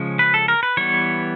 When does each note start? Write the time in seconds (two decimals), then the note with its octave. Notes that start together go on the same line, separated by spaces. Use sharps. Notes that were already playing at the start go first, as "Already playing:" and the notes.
Already playing: C#3 F3 G#3 C#4
0.19 B4
0.34 A4
0.48 A#4
0.63 B4
0.77 E3 G3 B3 C#5